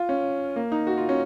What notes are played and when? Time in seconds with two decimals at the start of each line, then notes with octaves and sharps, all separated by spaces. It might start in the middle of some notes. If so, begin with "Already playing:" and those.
Already playing: F4
0.09 C#4
0.56 A#3
0.72 D#4
0.87 F#4
0.98 F4
1.09 C#4